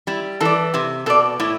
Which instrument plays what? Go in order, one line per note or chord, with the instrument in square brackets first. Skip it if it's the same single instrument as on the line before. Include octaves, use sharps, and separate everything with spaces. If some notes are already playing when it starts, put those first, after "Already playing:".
[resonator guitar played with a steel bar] G3 [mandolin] E4
[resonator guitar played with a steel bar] E3 [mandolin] A4 D5
[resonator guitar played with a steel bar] C3 [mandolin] E4
[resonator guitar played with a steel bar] B2 [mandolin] A4 D5
[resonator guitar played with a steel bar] A2 [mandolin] E4